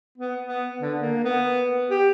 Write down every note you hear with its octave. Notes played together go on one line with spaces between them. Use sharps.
B3
B3
D3
A#3
B3
G4